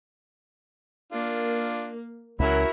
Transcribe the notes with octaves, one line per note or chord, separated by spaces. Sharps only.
A#3 D4 F4
C#2 F#3 C#4 E4 F#4 A#4